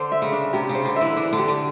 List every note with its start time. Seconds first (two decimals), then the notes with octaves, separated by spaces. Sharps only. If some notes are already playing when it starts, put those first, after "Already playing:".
Already playing: D3 C5
0.12 E5
0.22 C#3
0.32 D4
0.53 C3 G4
0.69 C#3
0.75 C5
0.85 D3
0.96 E3 E5
1.16 E3 D4
1.33 D3
1.38 G4
1.48 D3